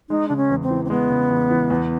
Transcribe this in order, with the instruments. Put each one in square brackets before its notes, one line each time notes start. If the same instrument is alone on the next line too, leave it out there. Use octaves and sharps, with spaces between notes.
[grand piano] G#3 [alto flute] D#4
[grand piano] C#3 [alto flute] D4
[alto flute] C#4
[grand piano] E2
[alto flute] C4
[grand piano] E3
[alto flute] C4
[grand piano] G#3 [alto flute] B3
[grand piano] C#3
E2
E3
E2